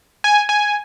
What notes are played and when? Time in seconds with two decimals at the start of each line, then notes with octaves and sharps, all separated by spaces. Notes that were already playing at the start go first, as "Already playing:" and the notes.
0.24 G#5
0.49 G#5